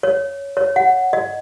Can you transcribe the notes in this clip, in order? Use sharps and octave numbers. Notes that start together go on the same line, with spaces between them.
C#5
C#5
F#5
D#5